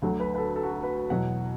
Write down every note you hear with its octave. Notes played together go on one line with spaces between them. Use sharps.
D2 D3 F#3 A3
B4
B4
A4
A4
F#4
A4
B4
E2 B2 F#3 F#5